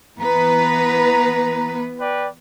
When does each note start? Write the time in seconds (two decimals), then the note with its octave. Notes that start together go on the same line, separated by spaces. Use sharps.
0.19 E3 B3 B4 A#5
1.99 B4 D5 G5